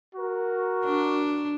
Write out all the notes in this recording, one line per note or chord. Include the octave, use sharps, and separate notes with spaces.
F#4 A#4
D4